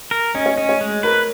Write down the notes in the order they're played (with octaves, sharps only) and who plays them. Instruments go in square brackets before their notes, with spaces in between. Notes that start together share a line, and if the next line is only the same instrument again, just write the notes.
[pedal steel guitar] A#4
[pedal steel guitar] C#4 [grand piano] D#5
[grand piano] C#5
[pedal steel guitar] C#4 [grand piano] D#5
[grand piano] C#5
[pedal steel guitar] G#3
[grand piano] A#4 [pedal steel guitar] B4